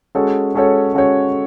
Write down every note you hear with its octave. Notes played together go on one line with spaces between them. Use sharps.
G#3 C#4 F#4 A4 C#5
G#3 C#4 F#4 A4 C#5
G#3 C#4 F#4 A4 C#5